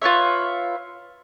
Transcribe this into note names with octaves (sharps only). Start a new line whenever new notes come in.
F4 B4 C#5 E5